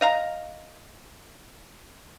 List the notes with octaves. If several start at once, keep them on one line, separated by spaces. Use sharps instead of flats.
D#5 F5 A#5